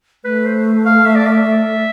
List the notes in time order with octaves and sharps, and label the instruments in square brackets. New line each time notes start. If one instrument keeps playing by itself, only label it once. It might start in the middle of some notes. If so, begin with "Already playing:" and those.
[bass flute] A3 [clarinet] B4
[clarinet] C5
F5
E5
D5
E5